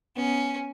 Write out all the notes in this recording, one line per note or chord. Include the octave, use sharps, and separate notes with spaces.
B3 C#4